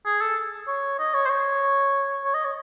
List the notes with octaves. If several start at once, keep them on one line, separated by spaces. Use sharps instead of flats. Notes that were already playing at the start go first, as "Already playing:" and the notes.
G#4
A4
C#5
D#5
C#5
C5
C#5
C#5
D#5
C#5